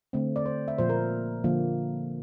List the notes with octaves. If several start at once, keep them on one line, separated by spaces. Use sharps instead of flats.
D3 A3 C4
D5
C5
E5
A#2 F3 A#3 C5
A#4
D3 F3 A#3